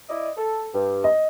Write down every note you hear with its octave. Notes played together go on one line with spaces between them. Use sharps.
E4 D5 D#5
A4
G2
D#5